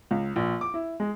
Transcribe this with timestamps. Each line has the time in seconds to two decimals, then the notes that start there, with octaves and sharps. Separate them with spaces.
0.11 C#2
0.36 A#1
0.61 D6
0.74 E4
1.00 G#3